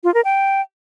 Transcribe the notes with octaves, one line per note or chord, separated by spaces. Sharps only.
F4
A#4
G5